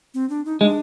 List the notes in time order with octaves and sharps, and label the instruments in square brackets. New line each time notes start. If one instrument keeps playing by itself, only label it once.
[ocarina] C4
D4
D#4
[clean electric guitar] G#3 [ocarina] D4